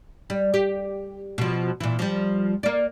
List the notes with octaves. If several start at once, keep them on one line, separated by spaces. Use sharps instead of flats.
G3
G4
B2 F3
A#2 E3
F3 G3
A#3 D5